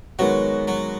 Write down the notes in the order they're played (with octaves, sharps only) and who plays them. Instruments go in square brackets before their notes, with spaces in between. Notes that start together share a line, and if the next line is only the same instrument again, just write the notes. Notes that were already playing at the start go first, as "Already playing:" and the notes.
[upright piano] D#3 G#3 B3 F#4 [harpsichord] F#3
[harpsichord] F#3